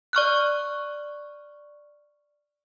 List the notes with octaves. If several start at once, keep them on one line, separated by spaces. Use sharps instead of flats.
D5 C#6 F6 F#6